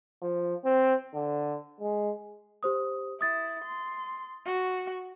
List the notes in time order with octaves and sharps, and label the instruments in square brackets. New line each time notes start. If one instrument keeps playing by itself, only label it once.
[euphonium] F3
C4
D3
G#3
[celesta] G4 C5 D#6
[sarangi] E4 [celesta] D#6 A6
[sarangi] C6
F#4